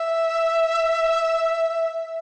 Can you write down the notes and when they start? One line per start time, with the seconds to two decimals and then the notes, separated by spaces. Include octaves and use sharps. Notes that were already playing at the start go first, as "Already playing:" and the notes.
Already playing: E5